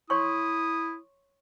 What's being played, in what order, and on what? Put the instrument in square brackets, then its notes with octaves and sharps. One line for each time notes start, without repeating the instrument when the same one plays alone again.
[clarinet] E4 [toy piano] C#5 C6 C#6 [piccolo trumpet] D#6